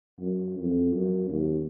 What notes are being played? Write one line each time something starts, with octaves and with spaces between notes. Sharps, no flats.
F#2
F2
F#2
D#2